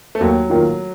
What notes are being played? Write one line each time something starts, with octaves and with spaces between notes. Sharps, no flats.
A3
D#2 F#3
D#3 A#3 F4